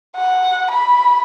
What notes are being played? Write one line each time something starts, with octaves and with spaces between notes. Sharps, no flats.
F#5
B5